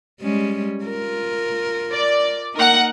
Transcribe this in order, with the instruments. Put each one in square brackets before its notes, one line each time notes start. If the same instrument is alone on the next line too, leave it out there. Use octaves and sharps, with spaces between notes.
[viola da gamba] G3 G#3 C#4
F4 A#4
[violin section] D5
[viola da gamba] A#3 D#4 [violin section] A#4 F#5